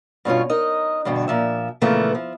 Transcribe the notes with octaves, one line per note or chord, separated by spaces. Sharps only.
G2 B2 C#4 F4
D#4 A#4 D#5
E2 G2 B2 D3
A#2 F3 E5
A#2 C#3 E3 F3 A3 B3
F3